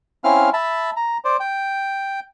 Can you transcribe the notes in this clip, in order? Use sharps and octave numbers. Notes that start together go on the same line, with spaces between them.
C4 C#4 E4 F5 F6
E5 A5 B5
A#5
C5 D5
G5